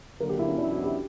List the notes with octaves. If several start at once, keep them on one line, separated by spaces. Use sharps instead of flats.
D3 F#3 A#3 A#4
G4
E4
C#4
E2 B2 F#3 B3 D4 E4
F#4
G4